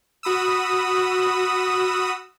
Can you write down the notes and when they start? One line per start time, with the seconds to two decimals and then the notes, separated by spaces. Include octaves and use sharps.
0.23 F#4 B5 D#6 E6